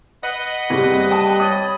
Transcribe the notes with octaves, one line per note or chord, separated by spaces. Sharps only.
B4 D#5 F#5 B5
F#1 C3 G3 G4
G5 A5 D#6
C#5 B5 D#6 A6